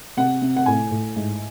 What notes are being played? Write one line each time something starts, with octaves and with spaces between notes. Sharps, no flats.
C3 F#5
C3
F#5
A2 G#5
A2
G#2